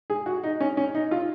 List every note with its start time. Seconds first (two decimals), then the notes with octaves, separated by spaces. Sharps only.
0.10 G#4
0.26 F#4
0.43 D#4
0.61 C#4
0.77 C#4
0.95 D#4
1.11 F4